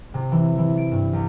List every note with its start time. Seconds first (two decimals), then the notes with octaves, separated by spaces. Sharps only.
0.14 C3
0.32 E3
0.58 E3
0.78 D7
0.91 G2
1.13 C2